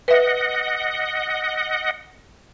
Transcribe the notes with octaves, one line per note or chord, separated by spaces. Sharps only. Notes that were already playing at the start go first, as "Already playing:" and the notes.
B4 D#5 E5 F#5